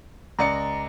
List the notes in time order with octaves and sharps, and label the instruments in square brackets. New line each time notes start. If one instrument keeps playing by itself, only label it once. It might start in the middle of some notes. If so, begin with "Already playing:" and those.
[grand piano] C#2 D5 C#7 [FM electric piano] A#5